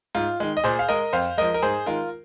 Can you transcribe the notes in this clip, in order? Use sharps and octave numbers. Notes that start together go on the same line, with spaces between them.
G#2 F4
D#3 G#3
D#5
A#2 G#4 C5
F5
G#3 A#4 D#5
F2 C5 F5
F3 G#3 A#4 D#5
A#4
G#2 G#4 C5
D#3 G#3 F4 A#4